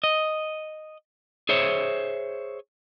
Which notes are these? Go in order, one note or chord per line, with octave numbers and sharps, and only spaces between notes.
D#5
G#4 C5 C#5 E5